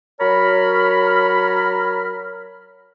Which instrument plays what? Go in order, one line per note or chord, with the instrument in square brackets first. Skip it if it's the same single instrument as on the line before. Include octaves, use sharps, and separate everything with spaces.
[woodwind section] F#3 A#4 C#5 A#5 B5 F6